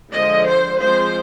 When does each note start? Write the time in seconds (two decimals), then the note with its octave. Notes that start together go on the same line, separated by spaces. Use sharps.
0.12 D3 F3 G#3 D#5
0.46 C5
0.78 F3 G#3 C4 C5